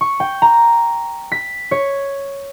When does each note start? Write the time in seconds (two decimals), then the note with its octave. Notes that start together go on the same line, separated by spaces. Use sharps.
0.01 C#6
0.20 G5
0.42 A#5
1.32 B6
1.71 C#5